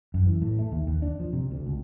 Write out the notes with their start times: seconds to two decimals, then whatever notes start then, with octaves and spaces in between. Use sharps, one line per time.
0.14 F#2
0.26 E3
0.42 A2
0.59 A3
0.72 D#2
0.87 D#2
1.02 D4
1.20 F3
1.33 C3
1.51 D2
1.66 C#2